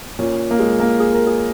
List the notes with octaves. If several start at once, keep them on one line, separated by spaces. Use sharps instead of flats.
A#2 C#4
A#3
G#3
A#3
G#4
A#4
G#4